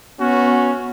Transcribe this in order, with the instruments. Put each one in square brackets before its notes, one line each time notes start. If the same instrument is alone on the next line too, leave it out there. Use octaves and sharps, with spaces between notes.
[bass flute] B3 [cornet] C#4 [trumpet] F#4